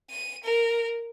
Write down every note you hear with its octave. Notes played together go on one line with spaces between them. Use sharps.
D#7
A#4